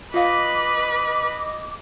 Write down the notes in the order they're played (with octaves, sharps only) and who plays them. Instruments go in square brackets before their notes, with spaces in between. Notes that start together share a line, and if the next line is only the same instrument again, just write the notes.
[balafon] F4 F5 [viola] B4 [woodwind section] D#5 D6